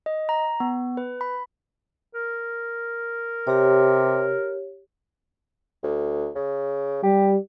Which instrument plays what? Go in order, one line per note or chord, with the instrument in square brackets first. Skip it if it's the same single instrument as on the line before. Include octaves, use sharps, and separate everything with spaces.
[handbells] D#5
A#5
B3
B4
B5
[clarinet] A#4
[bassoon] C3 [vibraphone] G4 C#5
[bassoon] D2
C#3
[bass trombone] G3 [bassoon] G4